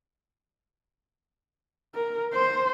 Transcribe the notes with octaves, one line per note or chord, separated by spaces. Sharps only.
A#4
C5